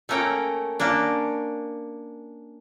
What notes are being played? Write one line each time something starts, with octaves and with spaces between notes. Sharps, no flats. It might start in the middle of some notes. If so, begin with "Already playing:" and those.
A3 A#3 C#4 A#4 G5
A#3 C#4 D4